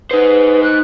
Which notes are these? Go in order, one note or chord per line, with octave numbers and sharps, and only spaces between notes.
D#4 B4 C5
F#6